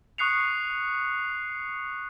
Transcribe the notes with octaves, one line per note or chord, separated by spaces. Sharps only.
C#6 D#6 F#6 C7 C#7 F7